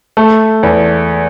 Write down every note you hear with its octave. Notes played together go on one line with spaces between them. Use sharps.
A3
E2